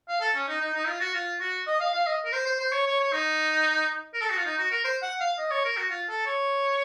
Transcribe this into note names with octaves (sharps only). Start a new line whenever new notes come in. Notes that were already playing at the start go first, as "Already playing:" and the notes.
F5
A4
C#4
D#4
D#4
D#4
F4
F#4
F4
F#4
D#5
F5
F5
D#5
A#4
C5
C5
C5
C#5
C#5
C#5
D#4
A#4
A4
F#4
F4
D#4
F#4
A#4
C5
F#5
F5
D#5
C#5
A#4
F#4
F4
A4
C#5